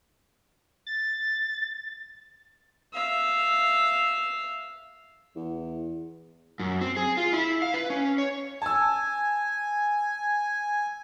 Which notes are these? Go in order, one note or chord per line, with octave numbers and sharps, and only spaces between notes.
A6
E5 F5
E2
F#2
C4
G#4
F4
E4
F5
B4
C#4
C#5
G#5 A5 E6